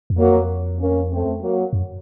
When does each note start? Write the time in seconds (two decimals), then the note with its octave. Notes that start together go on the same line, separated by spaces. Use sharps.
0.10 F2
0.17 F#3 A#3
0.79 A#3 C#4
1.10 A3 C4
1.41 F#3 A#3
1.73 F#2